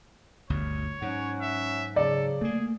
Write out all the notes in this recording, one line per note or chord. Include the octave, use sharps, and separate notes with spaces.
G1 D2 C#5
G#2 F#3 C#4 F#5
E5
C#3 F#3 A4 D5
A3 A#3 G#4